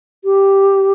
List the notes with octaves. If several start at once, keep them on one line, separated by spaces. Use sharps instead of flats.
G4